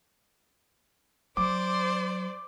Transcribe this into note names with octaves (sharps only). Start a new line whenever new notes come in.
F#3 C5 D5 D6